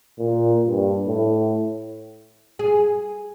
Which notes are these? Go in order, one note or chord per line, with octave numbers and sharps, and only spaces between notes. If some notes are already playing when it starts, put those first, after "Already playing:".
A#2
G2
A2
G#4